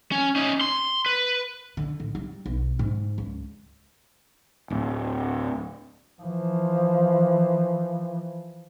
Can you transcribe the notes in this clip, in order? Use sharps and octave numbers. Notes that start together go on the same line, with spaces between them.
C#4
C#4 D#4
C6
B4
D3
D1
G3
B1
G#2
C#2
D1
E3 F3